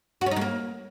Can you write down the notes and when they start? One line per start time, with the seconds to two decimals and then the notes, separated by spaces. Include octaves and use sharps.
0.21 F#4
0.26 C#4
0.31 D#4
0.36 G#3
0.41 A#3